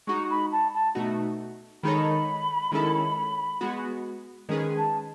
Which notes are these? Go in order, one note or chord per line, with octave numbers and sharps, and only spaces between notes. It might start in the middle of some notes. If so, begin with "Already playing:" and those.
G#3 D#4 F#4 C#6
B5
A5
A5
B2 A3 D#4 F#4
D#3 G#3 D#4 A4 C#5 B5
D#3 G#3 C#4 E4 A4
G#3 B3 F#4
D#3 G#3 C#4 G#4 B4
A5